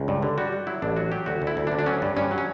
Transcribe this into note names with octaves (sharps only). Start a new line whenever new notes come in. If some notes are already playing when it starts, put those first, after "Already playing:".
Already playing: C#2
G2
D3
G3 F#4
G3
F#3 E4
A1 D4
F#3 F#4
F#3 G4
D2 F#4
D2
E4
D2
D4
D2
D4
F#3 C#4
G2
G2 C#4
F#3
C#4